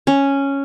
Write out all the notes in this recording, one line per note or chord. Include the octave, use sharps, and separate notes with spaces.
C#4